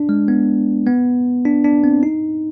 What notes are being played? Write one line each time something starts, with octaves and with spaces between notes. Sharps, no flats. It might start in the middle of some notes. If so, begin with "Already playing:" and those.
Already playing: D4
G#3
B3
B3
D4
D4
C4
D#4